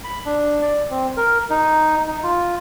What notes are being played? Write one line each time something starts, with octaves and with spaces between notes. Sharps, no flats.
B5
D4
D5
C4
A#4
D#4
D#4
F4